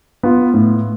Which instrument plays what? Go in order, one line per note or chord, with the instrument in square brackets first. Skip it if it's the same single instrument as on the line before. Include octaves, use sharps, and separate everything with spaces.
[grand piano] B3 F4
A2